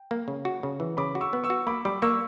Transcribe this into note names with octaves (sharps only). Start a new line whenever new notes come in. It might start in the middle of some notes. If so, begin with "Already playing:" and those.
Already playing: G5
A#3
C#3
F#4
C#3
E3
C#3 B5 D6
F#4
C#6 E6
B3
C#6 E6
F#4
A#3 B5 D6
G3 B5 D6
A#3 C#6 E6